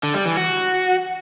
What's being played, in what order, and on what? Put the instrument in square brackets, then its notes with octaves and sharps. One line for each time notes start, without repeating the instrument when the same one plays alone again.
[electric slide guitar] D3
G3
E3
F#4